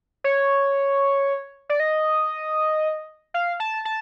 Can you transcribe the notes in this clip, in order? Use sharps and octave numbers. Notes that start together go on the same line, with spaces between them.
C#5
D5
D#5
F5
A5
A5